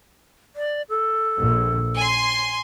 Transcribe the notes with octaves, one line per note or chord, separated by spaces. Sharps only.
D5
A4
A#1
G#5 C6